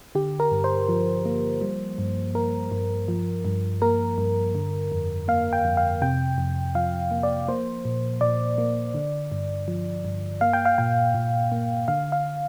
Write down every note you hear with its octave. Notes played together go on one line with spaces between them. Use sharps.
D3 G4
A#4
G2
C5
F3
A#3
G3
G2
A#3 A#4
G2
F3
G2
A#3 A#4
G2
D3
F2
A#3 F5
G5
F2
F5
C3 G5
F2
F3 F5
A#3
D5
A#3 C5
A#2
A#2 D5
A#3
D3
G2
F3
G2
A#3 F5
G5
F5
A#2 G5
A#2
A#3
D3 F5
F5